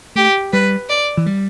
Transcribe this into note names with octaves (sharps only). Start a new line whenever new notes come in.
A3 G4
G3 B4
D5
E3
G3